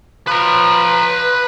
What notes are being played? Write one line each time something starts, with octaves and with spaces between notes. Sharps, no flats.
F3 B4 A#5